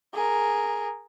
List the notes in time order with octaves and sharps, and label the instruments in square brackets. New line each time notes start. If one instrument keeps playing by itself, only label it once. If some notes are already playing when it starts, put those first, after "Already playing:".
[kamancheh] G#4 A#4